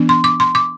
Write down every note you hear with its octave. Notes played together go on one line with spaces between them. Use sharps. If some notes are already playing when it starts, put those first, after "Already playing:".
Already playing: E3 B3 D4
C6
D6
C6
D6